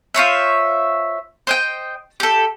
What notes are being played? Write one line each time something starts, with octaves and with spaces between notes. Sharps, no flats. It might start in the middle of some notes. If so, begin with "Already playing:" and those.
F4 C5 C#5 E5
C5 D#5 G5
G4 A4